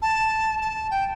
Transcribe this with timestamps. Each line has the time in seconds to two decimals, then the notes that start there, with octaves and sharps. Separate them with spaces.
0.02 A5
0.61 A5
0.91 G5